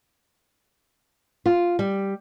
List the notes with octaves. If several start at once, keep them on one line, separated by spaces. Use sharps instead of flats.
F4
G3